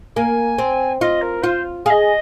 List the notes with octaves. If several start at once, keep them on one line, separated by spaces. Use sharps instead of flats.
A#3 G#5
C4
F4 D#5
A#4
F4 C5
G#4 D#5 F5